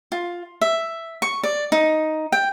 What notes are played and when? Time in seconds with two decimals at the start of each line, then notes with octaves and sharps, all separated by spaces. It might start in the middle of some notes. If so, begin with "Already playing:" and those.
0.12 F4
0.61 E5
1.22 C#6
1.43 D5
1.72 D#4
2.32 G5